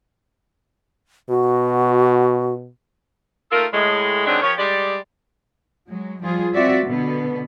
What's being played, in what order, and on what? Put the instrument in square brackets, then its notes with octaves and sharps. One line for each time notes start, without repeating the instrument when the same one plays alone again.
[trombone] B2 [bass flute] F#4
[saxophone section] A3 D#4 F4 A4 A#4
A2 G#3
D3 D#3 F#3 G#3 C4 D4
F3 G4 A#4 C#5
G3 G#3 D5
[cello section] F#3 G#3
F3 G3 F4 G#4
C4 F4 F#4 D5 E5
B2 D3 B3